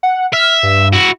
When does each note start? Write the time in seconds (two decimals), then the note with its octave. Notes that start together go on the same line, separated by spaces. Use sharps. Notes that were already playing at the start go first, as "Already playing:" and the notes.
0.03 F#5
0.33 E5 F6
0.63 G2
0.93 E4 F#4